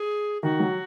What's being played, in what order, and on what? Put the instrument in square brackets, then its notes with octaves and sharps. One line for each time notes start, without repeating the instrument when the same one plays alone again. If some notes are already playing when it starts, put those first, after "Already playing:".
Already playing: [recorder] G#4
[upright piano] D#3 [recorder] F#4
[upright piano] F#3